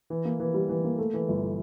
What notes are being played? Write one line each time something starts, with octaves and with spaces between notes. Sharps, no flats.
E3
A#3
E3
G3
E3
A#3
A3
E3
G1